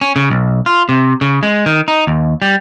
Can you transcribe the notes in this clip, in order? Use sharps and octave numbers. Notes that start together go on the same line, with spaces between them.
C#4
C#3
B1
F4
C3
C#3
G#3
D#3
D#4
D#2
G3